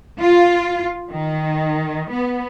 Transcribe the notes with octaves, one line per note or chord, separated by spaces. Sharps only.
F4
D#3
B3